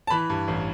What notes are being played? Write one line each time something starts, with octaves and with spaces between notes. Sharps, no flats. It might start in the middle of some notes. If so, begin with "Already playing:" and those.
A5
E3 B5
G2
A1